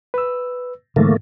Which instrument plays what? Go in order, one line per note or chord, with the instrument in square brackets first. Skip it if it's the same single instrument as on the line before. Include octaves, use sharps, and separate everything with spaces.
[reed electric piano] B4 E6
[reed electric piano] G#2 [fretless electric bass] D3 E3 G3 [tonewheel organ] A3 A#3